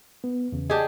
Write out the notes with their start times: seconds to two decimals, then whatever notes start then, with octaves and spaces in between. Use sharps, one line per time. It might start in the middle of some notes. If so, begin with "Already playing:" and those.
0.24 B3
0.52 E2 C#3
0.70 D4 G4 G#4 D#5